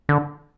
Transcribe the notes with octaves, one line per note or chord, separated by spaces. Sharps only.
D3